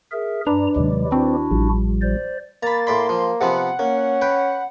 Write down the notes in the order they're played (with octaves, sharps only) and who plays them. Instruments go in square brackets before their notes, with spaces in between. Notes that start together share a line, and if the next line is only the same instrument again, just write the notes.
[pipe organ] G#4 A#4 E5
[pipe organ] G2 A#5 [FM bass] D4 [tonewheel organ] B4 D5
[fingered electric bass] D#2 D#3 [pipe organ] C3 F#3 G#3
[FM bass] C4 [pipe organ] D4 E4 F#4
[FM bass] A1 [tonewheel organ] F3 G3
[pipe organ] C5 D5
[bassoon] A#3 [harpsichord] A#5 B5 [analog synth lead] A6
[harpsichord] A2 D5 B5 [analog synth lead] C6
[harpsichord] F3
[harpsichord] C3 F3 B3 [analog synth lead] F#5
[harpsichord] A#3 [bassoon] C#4
[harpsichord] B4 G5